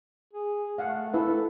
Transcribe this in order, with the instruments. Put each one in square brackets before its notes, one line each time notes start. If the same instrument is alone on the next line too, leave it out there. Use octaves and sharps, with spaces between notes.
[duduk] G#4
[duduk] A3 [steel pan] F5 F#5
[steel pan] E4 B4 E5 [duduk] A4